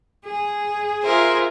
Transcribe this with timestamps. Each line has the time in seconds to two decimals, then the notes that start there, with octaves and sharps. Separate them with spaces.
0.24 G#4
1.03 F4 G#4 A#4 C5 E5